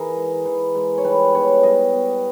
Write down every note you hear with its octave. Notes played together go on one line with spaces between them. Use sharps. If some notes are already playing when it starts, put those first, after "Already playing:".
Already playing: E3 G#4 A#4
G#3
E3
G#3
C#5
G3 B4
B3 C#5
G3 D#5
B3